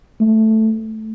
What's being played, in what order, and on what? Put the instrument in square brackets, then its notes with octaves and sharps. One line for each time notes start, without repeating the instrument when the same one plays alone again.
[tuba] A3